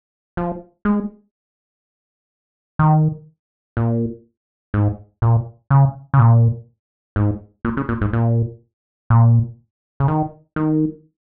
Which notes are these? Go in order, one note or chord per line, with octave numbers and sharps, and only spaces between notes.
F3
G#3
D#3
A#2
G#2
A#2
C#3
C#3
A#2
G#2
A#2
C#3
A#2
G#2
A#2
A#2
C#3
D#3
D#3